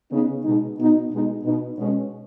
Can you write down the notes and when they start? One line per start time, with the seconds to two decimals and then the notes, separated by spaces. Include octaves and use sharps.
0.11 C#3 B3 D#4
0.44 B2 G#3 D#4
0.77 B2 B3 D#4
1.11 B2 G#3 B3 D#4
1.44 B2 B3 D#4
1.77 B2 G#3 C#4